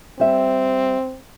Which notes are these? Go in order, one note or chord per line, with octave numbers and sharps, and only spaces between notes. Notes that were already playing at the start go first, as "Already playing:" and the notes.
G3 C4 E5